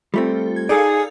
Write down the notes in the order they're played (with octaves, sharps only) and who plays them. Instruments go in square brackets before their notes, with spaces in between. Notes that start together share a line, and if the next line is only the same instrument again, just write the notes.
[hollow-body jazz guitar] G3 A3 C4 [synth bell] F4 A4
[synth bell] G#6
[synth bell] D#4 A4 F5 [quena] G#4 [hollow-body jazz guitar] D5